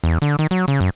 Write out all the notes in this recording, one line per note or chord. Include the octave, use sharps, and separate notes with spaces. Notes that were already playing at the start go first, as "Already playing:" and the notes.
E2
D3
D#3
F#3
C#3
F#2